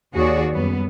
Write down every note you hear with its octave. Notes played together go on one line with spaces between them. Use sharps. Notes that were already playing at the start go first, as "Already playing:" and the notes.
D#2 F#4 G#4 C#5 D5
F#2 G3 B3